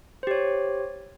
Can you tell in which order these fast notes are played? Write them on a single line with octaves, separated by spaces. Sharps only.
C5 G4 C#5